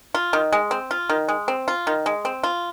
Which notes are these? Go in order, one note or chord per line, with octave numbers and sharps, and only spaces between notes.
F4
D#3
G#3
C4
F4
D#3
G#3
C4
F4
D#3
G#3
C4
F4